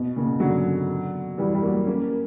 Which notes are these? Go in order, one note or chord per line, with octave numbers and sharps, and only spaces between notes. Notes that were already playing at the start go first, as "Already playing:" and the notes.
Already playing: B2
A#2 C#3
D3 F#3
E3 G3
G3
F#3 A#3
A#3 C#4